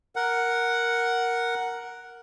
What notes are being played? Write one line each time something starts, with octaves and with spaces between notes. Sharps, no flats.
A#4 F#5